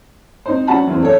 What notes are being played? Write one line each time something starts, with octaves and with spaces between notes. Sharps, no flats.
C4 D#4 C5
C#4 D4 F#4 F#5 A5 B5
E2 E3 C4
D4 A4 C#5